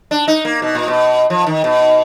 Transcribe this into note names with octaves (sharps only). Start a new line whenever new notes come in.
D4
D#4
A#3
B2
A#2
B2
F3
D#3
B2